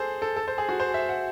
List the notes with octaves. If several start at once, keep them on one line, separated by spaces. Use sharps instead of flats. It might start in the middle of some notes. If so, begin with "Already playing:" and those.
Already playing: G#4 A4 C5
A4
A4
C5
G#4
F#4
C5
E5
F#5